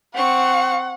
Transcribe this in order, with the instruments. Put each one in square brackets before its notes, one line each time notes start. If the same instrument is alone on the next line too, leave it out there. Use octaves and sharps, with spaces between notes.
[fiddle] C4 C#6 [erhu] F#5